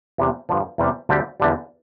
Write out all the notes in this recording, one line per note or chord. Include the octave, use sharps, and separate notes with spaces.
E2 C3 E3 G3
G2 D3 F3
E2 C3 G3
D2 D3 G3 C4 G4
E2 D3 G3